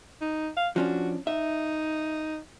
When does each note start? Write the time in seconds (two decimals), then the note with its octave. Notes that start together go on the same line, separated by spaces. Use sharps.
0.21 D#4
0.57 F5
0.76 F3 C#4 D4 F#4
1.27 D#4 E5